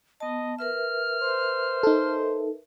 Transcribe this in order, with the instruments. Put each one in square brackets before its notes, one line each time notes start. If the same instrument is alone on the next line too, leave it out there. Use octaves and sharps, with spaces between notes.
[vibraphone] B3 A5 [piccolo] D#5
[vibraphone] A#4 B4 E5 [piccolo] F6
[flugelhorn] C5
[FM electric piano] D#4 A4